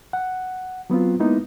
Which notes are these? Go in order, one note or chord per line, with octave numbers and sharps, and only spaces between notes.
F#5
F#3 B3 C4 F4
G#3 A#3 B3 D#4 E4